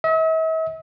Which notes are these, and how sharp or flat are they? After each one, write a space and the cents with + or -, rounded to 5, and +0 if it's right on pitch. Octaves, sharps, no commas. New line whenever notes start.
E5 -45